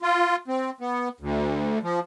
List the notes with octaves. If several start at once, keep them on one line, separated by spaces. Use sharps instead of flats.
F4
C4
B3
D2
F3